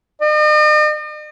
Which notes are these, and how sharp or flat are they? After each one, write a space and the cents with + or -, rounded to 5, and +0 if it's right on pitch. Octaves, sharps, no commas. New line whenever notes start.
D#5 -45